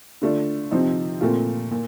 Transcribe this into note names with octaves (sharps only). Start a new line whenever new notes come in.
D3 A3 D4 F4
C3 F3 C4 D#4
A#2 A3 C4 F4
A#2